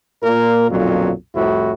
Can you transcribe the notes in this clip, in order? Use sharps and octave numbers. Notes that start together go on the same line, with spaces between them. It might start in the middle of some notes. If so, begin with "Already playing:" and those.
A#2 A#3 A#4
B1 F2 A#2 D3 F3 F#3
C2 F2 A2 C3 E4 F#4